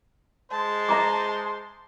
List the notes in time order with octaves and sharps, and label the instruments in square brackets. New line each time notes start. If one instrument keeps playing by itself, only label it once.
[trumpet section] G#3 C5 C6 [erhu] A5
[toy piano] E5 A#5 D6